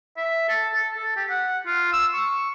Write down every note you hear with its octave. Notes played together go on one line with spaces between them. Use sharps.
E5
A4
A4
A4
G4
F#5
F4
E6
C#6